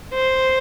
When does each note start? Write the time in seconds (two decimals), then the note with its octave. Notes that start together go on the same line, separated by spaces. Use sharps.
0.15 C5